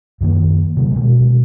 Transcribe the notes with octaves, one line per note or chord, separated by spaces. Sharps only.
F#2 D#3 A#3
C3 D#3 F#3
B2 G#3